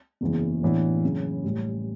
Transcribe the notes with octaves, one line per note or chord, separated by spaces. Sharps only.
F#1 E2 C#3 E3
A1 A2 E3 B3 D4
F#2 C#3 F#3
A1 A2 G3